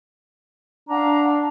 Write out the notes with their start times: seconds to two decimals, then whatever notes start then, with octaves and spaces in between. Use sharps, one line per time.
0.89 D4 F5 F#5 A#5